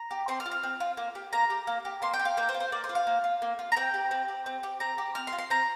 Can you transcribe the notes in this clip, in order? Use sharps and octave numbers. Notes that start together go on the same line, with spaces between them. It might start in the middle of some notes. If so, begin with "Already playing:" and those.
Already playing: A#5
G4
C4 C6
F6
F4
F6
C4
F4
A#3
G4
A#3 A#5
G4
A#3
G4
A#3 C6
G5
G4
F5
A#3 G5
C5
F4
C5
A#3 D5
C5
F4
F5
A#3
F4
A#3
F4
A#5
C4 G5
G4
C4
G4
C4
G4
C4 A#5
G4
C4 F6
C6
F4
C6
C4 A#5